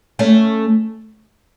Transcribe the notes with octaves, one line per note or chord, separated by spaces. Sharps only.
A3 C#4